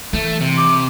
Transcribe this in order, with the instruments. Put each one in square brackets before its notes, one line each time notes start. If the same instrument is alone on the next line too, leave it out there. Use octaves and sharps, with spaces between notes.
[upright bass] E3 [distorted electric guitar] A3
[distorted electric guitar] C3
[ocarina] D6